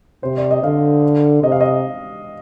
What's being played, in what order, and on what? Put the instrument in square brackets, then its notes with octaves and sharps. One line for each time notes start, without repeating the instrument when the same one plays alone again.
[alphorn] C3 [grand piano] C5
[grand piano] D5
D#5
[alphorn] D3 [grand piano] F5
[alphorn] C3 [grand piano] D#5
[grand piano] F5
D#5